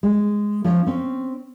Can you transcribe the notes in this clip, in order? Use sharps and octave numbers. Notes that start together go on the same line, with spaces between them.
G#3
F3 C#4 D#5
C4 C#4